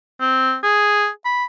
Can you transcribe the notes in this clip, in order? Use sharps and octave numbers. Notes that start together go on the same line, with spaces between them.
C4
G#4
B5